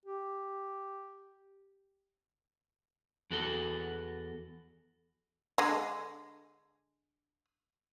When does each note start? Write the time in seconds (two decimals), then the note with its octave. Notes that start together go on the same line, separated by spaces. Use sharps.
0.06 G4
3.30 E2 F#4 A4
5.58 D3 G#3